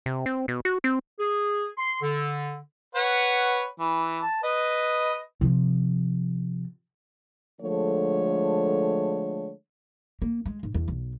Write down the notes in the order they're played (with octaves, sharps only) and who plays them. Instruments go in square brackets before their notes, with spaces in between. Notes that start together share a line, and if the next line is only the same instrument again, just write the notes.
[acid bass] C3
C4
B2
F#4
C4
[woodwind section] G#4
C6
D3
[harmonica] B4 C#5 F#5
E3
A5
B4 D#5
[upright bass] C3 F3
[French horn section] D3 F3 G#3 A3 A4 C#5
[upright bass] A#3
G#3
G#2
E2
B1